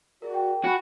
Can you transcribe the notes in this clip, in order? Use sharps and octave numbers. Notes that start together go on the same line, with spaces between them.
F#4 G#4 A#4 D5
G5
F#4 G#5 B5 C#6